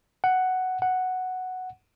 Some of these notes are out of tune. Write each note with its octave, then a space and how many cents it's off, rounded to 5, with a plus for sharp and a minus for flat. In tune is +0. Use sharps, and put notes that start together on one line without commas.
F#5 +5
F#5 +0